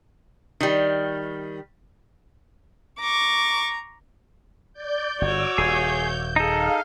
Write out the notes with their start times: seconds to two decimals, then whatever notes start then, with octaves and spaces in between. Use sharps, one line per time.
0.60 D#3 G3
3.01 A#5 C#6 D6
4.73 D5 G6
5.21 G1 F#4 C#5 D6 E6
5.58 D#1 G#4 G6
6.36 D#4 G#4 A4 F5